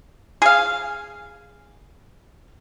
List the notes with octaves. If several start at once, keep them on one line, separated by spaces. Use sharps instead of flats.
G#4 F5